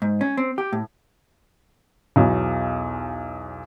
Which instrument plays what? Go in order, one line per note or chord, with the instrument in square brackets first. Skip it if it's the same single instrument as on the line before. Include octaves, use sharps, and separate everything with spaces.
[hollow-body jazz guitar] G#2
C#4
C4
G4
A2
[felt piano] B1 E2 F#3